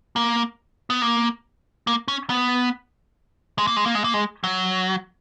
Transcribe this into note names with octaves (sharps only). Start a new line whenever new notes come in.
A#3
B3
A#3
A#3
C#4
B3
G#3
A#3
G#3
A#3
G#3
A#3
G#3
F#3